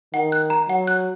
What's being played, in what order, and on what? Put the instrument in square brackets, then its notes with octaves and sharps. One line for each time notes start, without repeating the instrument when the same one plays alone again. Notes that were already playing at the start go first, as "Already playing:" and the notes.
[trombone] D#3 [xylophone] F#5
[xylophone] F#6
A#5
[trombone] F#3 [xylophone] F#5
[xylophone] F#6